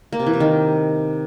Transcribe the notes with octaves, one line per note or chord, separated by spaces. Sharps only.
A#3
C3
E3
C3
D#3